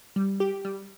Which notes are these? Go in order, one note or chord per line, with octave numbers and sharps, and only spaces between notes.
G3
G4
G3